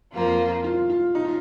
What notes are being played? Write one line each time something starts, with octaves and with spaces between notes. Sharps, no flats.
F2 F3 A#3 F4
F4
F4
D#4
F4